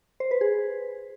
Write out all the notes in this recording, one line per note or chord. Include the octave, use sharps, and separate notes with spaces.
C5
B4
G#4